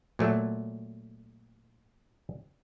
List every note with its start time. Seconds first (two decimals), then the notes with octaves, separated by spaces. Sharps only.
0.19 A#2 F#3 A3